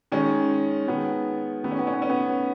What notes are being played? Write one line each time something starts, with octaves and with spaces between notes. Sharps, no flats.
D#3 G#3 C#4
D#3 G#3 B3
D#3 A3 B3
C#4
B3
C#4
B3
C#4
B3